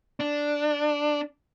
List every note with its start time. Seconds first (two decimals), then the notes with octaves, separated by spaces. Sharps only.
0.20 D4